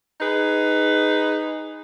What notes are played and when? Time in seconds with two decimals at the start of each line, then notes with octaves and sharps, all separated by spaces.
0.20 D#4 G#4 B4